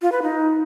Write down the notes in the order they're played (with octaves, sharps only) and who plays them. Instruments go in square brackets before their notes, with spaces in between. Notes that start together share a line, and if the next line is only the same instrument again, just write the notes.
[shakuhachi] F4
B4
D#4